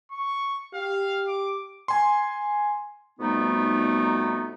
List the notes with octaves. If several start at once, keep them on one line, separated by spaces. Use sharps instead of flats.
C#6
G4 F5
D6
G#5 C6
F2 B2 G3 A3 B3 D#4